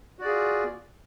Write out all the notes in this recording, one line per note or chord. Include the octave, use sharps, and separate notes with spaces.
F4 F#4 G#4 D5